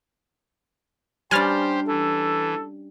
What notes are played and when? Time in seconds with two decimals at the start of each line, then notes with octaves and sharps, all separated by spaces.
1.31 G3 C#4 D4 G4 C5 G#5 F6 A6
1.87 E3 A4